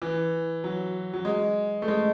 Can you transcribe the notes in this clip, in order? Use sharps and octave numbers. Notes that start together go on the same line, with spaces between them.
E3
F#3
F#3
G#3
A3
G#3